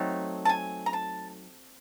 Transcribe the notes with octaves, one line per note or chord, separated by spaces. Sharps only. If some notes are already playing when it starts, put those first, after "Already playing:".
Already playing: F#3 A3 C4 D#4
A5
G#5
A#5
A5